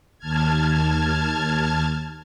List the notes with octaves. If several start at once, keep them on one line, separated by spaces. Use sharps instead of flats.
D#2 A5 F6 G#6